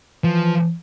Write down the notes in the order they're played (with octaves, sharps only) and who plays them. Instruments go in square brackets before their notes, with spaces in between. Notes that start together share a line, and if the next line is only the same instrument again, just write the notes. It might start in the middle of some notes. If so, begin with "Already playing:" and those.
[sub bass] E3 [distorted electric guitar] F3